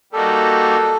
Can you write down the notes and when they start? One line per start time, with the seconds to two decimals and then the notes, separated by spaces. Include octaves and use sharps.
0.12 G3 A#3 D#4 F#4 A4 A#4